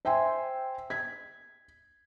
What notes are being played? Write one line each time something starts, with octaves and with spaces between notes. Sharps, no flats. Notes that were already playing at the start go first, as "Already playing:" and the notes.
C5 E5 G5 G#5 C6
G#6 B6